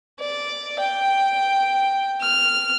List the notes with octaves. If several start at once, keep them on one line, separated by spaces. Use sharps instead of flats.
D5
G5
F6